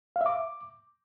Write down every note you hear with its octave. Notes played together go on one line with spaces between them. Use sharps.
F5
E5
D6